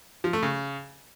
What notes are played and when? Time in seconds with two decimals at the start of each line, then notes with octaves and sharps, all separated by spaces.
0.24 F3
0.33 A3
0.42 C#3